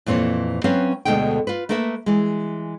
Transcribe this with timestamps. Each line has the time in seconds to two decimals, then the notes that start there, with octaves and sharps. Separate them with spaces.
0.06 F2 A#2 E3 C4 C#5
0.64 F#3 C4 C#4 B4 F5
1.05 D2 B2 D3 G#3 A3 G5
1.47 F4 B4
1.69 A3 A#3 A#4 B4 E5
2.06 E3 G#3